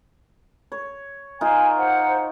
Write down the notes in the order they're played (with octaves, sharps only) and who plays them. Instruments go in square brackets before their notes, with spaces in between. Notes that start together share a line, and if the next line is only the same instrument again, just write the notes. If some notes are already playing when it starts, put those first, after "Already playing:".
[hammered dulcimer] C#5
[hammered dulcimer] D#4 F4 A#4 [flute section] F5 G#5
[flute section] C5 F#5